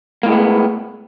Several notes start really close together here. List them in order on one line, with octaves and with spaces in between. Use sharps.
A#3 A2 G#3 B3